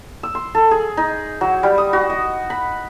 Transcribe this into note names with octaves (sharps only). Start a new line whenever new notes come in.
E6
C6
A4
G#4
D#4
F#3
G3
D#6
F#4
D#5
B5